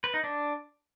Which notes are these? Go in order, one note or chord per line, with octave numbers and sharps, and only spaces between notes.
B4
D#4
D4